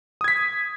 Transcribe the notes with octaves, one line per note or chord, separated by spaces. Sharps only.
D#6 G#6 B6